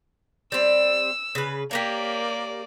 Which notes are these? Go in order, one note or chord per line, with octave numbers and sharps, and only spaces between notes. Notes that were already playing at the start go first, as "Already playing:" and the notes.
G3 C4 E6
C#3 B4
A#3 G4 A#4 C#5 D5